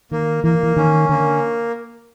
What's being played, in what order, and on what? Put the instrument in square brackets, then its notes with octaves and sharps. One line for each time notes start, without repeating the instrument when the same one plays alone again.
[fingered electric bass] D#3 [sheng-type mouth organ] A#3
[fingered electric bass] E3 [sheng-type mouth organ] A#3
[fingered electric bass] E3
[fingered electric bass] D#3 [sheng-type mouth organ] C#4
[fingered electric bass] D3 [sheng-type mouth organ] A#3